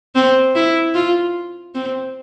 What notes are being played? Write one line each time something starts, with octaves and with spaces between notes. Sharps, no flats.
C4
E4
F4
C4